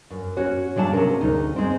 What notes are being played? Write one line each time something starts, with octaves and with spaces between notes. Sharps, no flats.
F#2
C#4 F#4 C#5
C#3 F#3 D4 E5 A5
C3 C#4 G#4 A#4
D2 D#4
G#3 C4